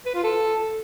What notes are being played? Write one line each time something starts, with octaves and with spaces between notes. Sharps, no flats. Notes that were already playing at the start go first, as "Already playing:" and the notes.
B4
F4
A4